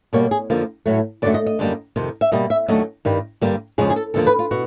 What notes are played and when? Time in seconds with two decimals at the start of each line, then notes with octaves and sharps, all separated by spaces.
0.13 B2 G3 A#3 C#5
0.31 G#4
0.50 F2 D3 F3 A#3
0.86 A2 F#3 A3
1.22 F#2 D3 F#3 A3 D5
1.34 D#5
1.47 D#5
1.59 F#2 D3 G3 A#3
1.96 F2 C3 D#3
2.21 E5
2.32 B2 G3 A#3 D#5
2.50 E5
2.68 D#2 D3 F#3 A3 D#5
3.05 G2 D#3 G3
3.41 G2 D3 G3 A#3
3.78 F2 C#3 F3 G#3 G#4
3.90 G#4
3.96 A4
4.14 D#2 D3 F3 A#3 A4
4.27 B4
4.39 F4
4.51 B2 F#4